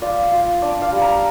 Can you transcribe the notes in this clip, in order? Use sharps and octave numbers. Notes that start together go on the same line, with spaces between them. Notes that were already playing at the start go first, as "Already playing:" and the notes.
F4 D5
F4
D4 D5
F5
G3
A#5